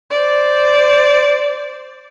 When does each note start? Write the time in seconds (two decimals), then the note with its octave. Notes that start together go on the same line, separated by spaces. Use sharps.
0.11 C5 D5